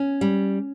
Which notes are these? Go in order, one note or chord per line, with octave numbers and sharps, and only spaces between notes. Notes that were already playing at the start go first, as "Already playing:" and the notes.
Already playing: C#4
G3